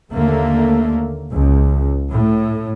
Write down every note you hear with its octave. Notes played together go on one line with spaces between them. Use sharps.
D#2 D3 A3 A#3
C#2
A2